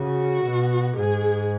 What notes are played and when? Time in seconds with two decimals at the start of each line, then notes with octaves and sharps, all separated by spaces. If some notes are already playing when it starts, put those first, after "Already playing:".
Already playing: C#3 F#4
0.44 B2
0.96 G#2 G#4